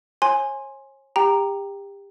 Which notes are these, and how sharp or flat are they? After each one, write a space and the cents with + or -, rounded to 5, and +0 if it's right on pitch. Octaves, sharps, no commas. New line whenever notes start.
C#5 -40 G#5 +0 C6 +10
G4 +30 G5 +0 A#5 +0